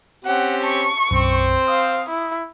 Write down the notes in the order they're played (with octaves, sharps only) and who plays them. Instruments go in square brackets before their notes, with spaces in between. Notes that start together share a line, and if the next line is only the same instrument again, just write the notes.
[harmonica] C4 C#4 G4 [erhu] F#5
[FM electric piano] A5 [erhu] C#6
[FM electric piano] B1 F#2 [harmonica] C4 C5
[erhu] F5 [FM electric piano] D#6
[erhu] E4